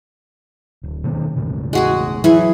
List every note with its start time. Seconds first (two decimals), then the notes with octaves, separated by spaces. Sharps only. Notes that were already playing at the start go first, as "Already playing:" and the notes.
0.83 D1
1.04 B2 D#3 A#3
1.36 E1 A2 C#3
1.73 G#3 F#4 G#4
2.24 E3 F#3 E4 G#4